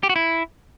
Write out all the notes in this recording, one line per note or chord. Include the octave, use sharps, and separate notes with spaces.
G4
F#4
E4